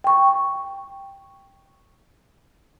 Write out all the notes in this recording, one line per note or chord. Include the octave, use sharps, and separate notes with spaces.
G5 C#6